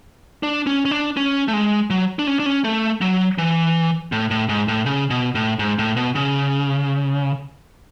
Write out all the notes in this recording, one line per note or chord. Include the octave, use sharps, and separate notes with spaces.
D4
C#4
C#4
D4
C#4
A3
G#3
F#3
D4
C#4
D4
C#4
A3
F#3
E3
A2
A2
G#2
A2
C#3
B2
A2
G#2
A2
B2
C#3